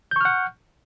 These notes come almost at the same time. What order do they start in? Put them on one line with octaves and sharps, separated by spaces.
G6 C#6 F6 F#5